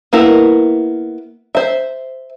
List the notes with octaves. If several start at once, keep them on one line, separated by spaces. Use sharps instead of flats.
A#3 B3 E4 A#4
C5 E5